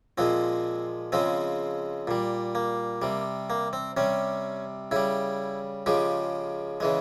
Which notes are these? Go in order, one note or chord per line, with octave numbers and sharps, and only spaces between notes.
A#2 F3 G#3 C4
C#3 F3 G#3 C4
A#2 G3
A#3
C3 G3
A#3
C4
C3 G3 C#4
C#3 G3 E4
C#3 F3 G#3 G4
C#3 E3 G#3